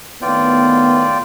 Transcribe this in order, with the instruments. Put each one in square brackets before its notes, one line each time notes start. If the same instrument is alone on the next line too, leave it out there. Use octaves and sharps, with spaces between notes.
[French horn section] A2 D#3 B3 [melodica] F4 D5 G5